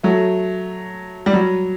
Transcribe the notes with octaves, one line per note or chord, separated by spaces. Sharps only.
F#3 A3
G3
F#3